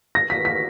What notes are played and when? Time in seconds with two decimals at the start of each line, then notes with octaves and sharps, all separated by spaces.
0.15 A#6
0.30 B6
0.45 B6